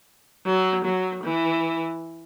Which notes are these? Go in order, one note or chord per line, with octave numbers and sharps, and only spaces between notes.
F#3
F#3
E3